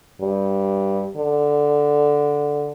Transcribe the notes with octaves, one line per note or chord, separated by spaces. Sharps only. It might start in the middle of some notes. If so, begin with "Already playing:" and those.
G2
D3